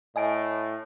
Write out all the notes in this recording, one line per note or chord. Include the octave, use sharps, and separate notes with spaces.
A2 D#5 G#5 D7